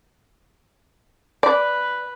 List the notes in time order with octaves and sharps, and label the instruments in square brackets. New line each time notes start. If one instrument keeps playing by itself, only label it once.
[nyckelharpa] B4 [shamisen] D5